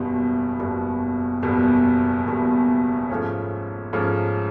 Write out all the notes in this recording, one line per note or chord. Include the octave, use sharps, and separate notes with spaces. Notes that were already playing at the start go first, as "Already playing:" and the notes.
Already playing: F#1 E2 B2 G3
F#1 E2 B2 G3
F#1 E2 B2 G3
F#1 E2 B2 G3
G#2 F3 A3 C#4
G#2 F3 A3 C#4